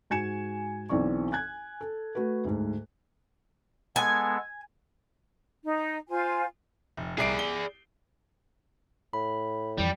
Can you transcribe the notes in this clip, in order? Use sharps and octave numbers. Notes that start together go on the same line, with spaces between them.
G#2 F#4 G#5 G#6 C#7 E7
B1 E3 C4 D5 C#6
G#5 F#6 G#6
A4
A3 F#4 B4
D2 G#2
G#3 B3 A4 G#5
D#4
F4 C5 G#5
F1
C2 G#4 D5 C7 D7
G7
A2 B5
F2 E3 G3